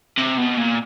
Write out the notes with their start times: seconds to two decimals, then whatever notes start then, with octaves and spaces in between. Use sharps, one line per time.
0.17 C3
0.38 B2
0.57 A#2